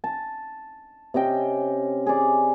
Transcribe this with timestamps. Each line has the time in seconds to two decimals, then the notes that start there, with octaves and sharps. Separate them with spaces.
0.04 A5
1.14 C3 C#4 D#5 G5
2.06 G#4 D5